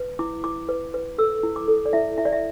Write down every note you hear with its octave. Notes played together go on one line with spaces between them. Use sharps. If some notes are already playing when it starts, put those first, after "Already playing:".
Already playing: B4
E4 D6
E4 D6
B4
B4
A4 E6
E4
D6
A4
D5
E4 E5
E4 E5
D5
E5